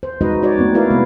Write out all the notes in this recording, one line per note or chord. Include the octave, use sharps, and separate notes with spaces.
C5
G#3 D#4 F#4 B4 C5 D#5
D#4 F#4 C#5 D5
A3 B3 C4 D#4
E4 F#4 A#4 B4 D5 F5
C3 G#3 A#3 B3